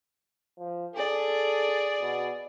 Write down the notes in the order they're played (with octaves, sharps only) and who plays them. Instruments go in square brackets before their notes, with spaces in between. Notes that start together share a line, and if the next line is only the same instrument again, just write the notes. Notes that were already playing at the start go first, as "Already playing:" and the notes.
[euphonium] F3
[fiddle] G#4 D5 [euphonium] A4
[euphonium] B2